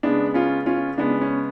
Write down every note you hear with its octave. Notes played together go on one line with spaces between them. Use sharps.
C#3 G#3 B3 D4
C#4 F4
C#4 F4
C#3 G#3 B3 D4
C#4